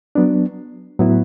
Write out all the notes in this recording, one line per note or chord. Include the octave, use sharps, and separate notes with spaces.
F#3 B3 D4
A2 F#3 B3 E4